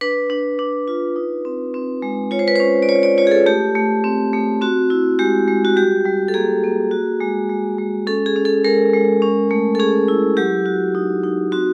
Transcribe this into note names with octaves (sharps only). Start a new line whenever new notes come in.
D4 B4
D4
D4
F4
D#4
C4
C4
G#3
F4 C#5
C5
B4
C#4 C5
D5
F4 C#5
D5
F4 C#5
G#4
A4
A3 G4
A3
C4
A3
C4 F#4
E4
G#3 G4
G#3
F#4
G3 G4
G3
A4
A#3 G#4
A#3
F#4
G#3
G#3
G#3
C#4 A4
G#4
C#4
A4
G#3 A#4
G#3
C#4
A3
A4
C#4 G#4
E4
F#3 G4
F#4
D#4
D#4
C4 F#4